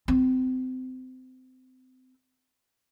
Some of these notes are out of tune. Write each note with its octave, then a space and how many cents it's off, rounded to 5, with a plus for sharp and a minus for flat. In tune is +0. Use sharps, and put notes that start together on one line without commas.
C4 -30